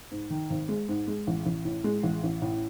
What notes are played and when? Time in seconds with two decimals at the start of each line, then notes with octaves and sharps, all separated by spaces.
0.11 G#2
0.30 D#3
0.50 G#1
0.69 G#3
0.89 G#2
1.08 G#3
1.27 A1
1.46 A1
1.65 A2
1.84 G#3
2.03 A1
2.23 A1
2.42 A2